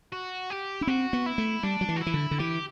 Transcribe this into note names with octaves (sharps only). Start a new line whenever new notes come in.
F#4
G4
D4 E4
C4 F#4
B3
E4
A3
G3 D4
F#3
E3
F#4
E4
E3
D3
D3
E3 G4